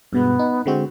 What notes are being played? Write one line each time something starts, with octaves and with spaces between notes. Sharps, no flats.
G2 B2 G#3 B3
D#4
D3 G#3 C4 F#4